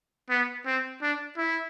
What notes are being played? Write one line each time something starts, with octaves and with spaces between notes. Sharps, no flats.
B3
C4
D4
E4